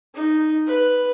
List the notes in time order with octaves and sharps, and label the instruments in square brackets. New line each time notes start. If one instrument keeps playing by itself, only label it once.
[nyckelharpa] D#4
B4